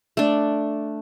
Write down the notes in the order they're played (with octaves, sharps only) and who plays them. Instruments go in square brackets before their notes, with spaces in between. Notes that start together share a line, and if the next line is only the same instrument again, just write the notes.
[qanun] A3 D4